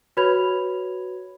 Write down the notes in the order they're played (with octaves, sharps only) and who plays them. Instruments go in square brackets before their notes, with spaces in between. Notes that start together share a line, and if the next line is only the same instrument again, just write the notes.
[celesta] F#4 B4 C#5 B5 G#6 F7